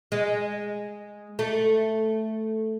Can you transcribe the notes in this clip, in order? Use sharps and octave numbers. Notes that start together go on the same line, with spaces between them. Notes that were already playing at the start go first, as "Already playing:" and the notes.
G#3
A3